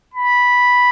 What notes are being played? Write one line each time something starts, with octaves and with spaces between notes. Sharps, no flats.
B5